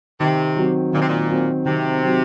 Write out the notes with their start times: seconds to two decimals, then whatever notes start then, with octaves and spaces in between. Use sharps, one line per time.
0.20 C3 D#3
0.56 F#3 C4
0.93 A#2 D#3
1.01 C3
1.09 A#2
1.29 F#3 C4
1.66 C3 D#3
2.02 F#3 C4